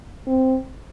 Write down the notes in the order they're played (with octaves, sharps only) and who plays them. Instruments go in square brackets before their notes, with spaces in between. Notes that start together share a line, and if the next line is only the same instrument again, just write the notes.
[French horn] C4